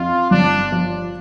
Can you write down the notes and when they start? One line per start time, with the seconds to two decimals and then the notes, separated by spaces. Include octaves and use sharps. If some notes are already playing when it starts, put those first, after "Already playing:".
Already playing: F2 F4
0.31 G1 D4
0.72 F3